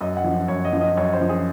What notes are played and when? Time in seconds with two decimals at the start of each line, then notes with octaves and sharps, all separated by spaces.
0.01 F#2 D#5
0.17 F#5
0.24 F3
0.48 F#2 C#5
0.65 D#5
0.73 F3
0.81 D#5
0.97 F#2 C#5
1.13 C5
1.21 F3
1.29 G#4